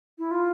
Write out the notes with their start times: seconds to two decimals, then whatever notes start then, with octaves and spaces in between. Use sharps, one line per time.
0.18 E4
0.31 F4